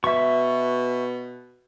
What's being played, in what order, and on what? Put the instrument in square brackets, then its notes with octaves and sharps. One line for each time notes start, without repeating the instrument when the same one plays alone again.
[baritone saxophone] B2 [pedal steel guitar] E5 C#6